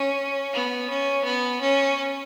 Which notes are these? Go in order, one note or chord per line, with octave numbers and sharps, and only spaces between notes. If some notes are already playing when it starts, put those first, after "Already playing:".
Already playing: C#4
B3
C#4
B3
C#4